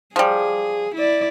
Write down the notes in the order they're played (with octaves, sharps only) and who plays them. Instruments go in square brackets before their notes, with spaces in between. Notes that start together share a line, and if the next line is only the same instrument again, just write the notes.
[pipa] F3 G3 [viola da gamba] G#4
[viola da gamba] E4 D5